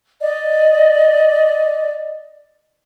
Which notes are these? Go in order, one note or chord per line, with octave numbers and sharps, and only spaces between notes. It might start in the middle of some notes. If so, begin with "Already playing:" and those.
D5 D#5